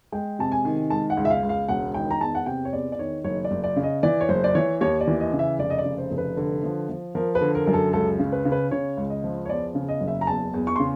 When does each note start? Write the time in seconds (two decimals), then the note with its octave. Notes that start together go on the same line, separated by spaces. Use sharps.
0.12 G#3 G5
0.39 C3 A5
0.52 G#5
0.65 D#3
0.90 G#3 A5
1.10 F#5
1.17 C#2
1.25 E5
1.30 F5
1.43 C#2
1.49 F5
1.68 E1 F#5
1.94 D#3 G5
2.11 A#5
2.21 E2 A5
2.35 F#5
2.46 C3 G5
2.65 C#5
2.73 E2 D5
2.92 D5
2.99 D#3 C#5
3.24 F#1 C#5
3.44 D5
3.51 F#1
3.64 D5
3.76 C#3
3.83 D#5
4.03 E3 D5
4.21 C#5
4.29 F#1 C5
4.44 D5
4.55 E3 C#5
4.81 D#2 C#5
5.01 D5
5.07 E3
5.20 D#5
5.33 C#3
5.39 E5
5.59 F1 D5
5.70 D#5
5.78 D5
5.84 C#3
5.98 C5
6.11 F1
6.18 B4
6.37 D3
6.63 F3
6.89 F3
7.15 F3 A#4
7.35 B4
7.41 D3
7.55 A#4
7.66 F#2 A#4
7.74 A4
7.93 C#2 A4
8.19 C#3
8.32 B4
8.45 C#3
8.52 B4
8.71 C#3 C#5
8.97 C#2
9.10 D#5
9.24 F3
9.46 C#5
9.49 E2 D5
9.75 C#3
9.89 D#5
10.01 F#1
10.08 E5
10.21 A#5
10.27 E2 A5
10.54 E2
10.67 C#6
10.76 C#3 C6